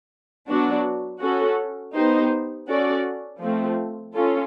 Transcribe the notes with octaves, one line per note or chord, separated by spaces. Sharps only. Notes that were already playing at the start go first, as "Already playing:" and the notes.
F#3 B3 D4 F#4
C#4 F#4 A4
B3 D#4 G4 C5
C#4 F#4 A4 D5
F3 A3 C4
C#4 F4 A4